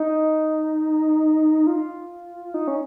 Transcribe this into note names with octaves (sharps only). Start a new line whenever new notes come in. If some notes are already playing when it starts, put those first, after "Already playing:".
Already playing: D#4
F4
D#4
C#4